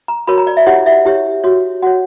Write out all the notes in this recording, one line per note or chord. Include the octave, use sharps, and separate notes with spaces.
A#5
F#4 A#4 C#5 B5
A#5
D5
E5
E4 G4 C#5 F#5
E5
E4 G4 C#5
F#4 C#5
F#4 C#5 F#5